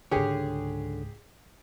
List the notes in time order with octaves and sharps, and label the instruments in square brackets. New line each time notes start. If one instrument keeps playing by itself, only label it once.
[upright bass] C#2 G#2 [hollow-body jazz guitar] D3 C#5 [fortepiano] G4 G#4